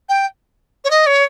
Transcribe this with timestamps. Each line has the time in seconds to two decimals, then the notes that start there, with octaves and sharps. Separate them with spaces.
0.09 G5
0.84 C#5
0.90 D#5
1.06 C#5